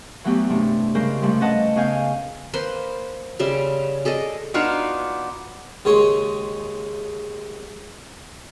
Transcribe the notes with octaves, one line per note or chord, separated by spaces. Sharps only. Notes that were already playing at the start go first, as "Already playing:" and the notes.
E3 F#3 A3 B3 G4
G2 C3 A3
C#3 G3 G#3 A#4 C5
G2 C3 F3 G3 A3
C#4 B4 D#5 F#5 A5 D#6
C#3 B3 G#4 F5 G#5 G6
A#3 B4 C5 C6
C#3 G3 E5 C6
G#4 A4 D5 D#5
B3 D4 D#4 F4 F#4
D#2 C#3 G#3 C#5 C6